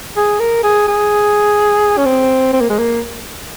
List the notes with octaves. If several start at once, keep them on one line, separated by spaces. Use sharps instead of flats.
G#4
A#4
G#4
G#4
C#4
C4
C4
A#3
G#3
A#3